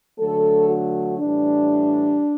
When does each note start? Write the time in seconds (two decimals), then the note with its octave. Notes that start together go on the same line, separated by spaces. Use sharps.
0.18 D3 F#3 A3 A4
0.69 F#4
1.20 A2 E3 G3 D4